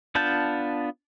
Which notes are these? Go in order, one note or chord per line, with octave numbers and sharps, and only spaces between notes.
B3 D4 F4 A5 G6